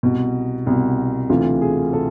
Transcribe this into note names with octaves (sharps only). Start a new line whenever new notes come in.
C2 B2
C2 B2
D2 C3 E3 F4
G#4
C3 A4